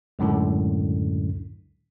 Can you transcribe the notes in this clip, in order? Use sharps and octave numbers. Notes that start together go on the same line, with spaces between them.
C#2 F#2 A2 D3